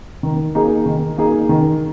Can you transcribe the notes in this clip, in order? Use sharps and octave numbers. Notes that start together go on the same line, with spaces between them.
D#3
A#3 D#4 G#4
D#3
A#3 D#4 G#4
D#3